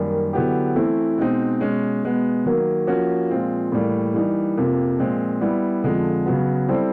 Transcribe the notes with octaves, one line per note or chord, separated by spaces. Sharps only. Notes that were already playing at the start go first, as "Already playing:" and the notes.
Already playing: F#2 D#3 G3 A#3
D3 F#3 B3 E4 G4
E3 A3 C4 E4
B2 G#3 C4 D#4
B2 G#3 C#4
B2 G#3 B3
D#3 F#3 A#3
F3 A#3 C#4 F#4
A#2 F3 G#3 C4 F4
A2 E3 G3 A#3
E3 G3 A#3 D#4
F2 C3 F3 A#3
A#2 F3 G#3 C4
G3 B3 E4
F2 D3 F3 G#3
C#3 F#3 B3
G3 C4 E4 A4 C5